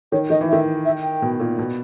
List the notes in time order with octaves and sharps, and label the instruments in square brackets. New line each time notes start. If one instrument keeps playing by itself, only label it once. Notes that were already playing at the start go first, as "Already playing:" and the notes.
[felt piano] D#3 [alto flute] C#5
[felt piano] D#3 [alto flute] D#5
[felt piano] E3
[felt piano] D#3 [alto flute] E5
[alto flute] E5
G5
[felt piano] B2
A#2
B2